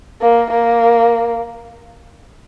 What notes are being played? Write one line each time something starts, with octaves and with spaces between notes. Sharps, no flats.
A#3
A#3